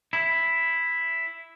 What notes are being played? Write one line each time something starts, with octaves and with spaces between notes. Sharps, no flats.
E4